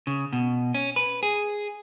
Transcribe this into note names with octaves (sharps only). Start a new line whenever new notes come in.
C#3
B2
C#4
B4
G#4